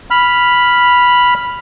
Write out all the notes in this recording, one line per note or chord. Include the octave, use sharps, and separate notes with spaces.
B5 F6